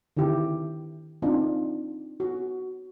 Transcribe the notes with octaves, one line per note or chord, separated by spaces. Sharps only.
D3 D#3 E4 G4
C4 D4 D#4 F4
F#4